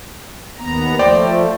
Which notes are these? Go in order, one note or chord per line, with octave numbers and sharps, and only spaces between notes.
D#2 B3 A#5
F3 A3 C5 D5 G5